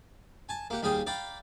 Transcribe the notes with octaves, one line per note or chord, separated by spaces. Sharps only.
G#5 A5
A#3 G4 F#5
D#2 G3 G#4 F5 G5 D#6
D5 F5 G5 A#5 B5